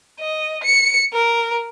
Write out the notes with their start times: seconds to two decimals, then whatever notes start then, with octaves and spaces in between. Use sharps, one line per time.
0.20 D#5
0.64 C#7
1.13 A#4